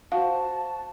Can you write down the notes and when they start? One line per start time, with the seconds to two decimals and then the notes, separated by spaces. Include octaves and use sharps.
0.12 F#4 C5 F5 A5